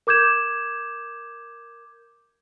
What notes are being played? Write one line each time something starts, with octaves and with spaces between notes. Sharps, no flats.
A#4 D6 G6 G#6 E7